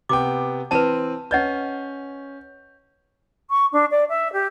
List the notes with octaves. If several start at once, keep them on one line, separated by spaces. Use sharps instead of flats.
C3 B3 G5 D6
E3 C4 B4 A5 D#7
C#4 B4 D#5 F#5 G6
C#6
D4
D5
E5
G4